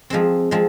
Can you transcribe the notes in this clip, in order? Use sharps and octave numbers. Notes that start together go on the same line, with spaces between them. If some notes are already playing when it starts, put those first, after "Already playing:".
F3 G#3 C4
F3 G#3 C4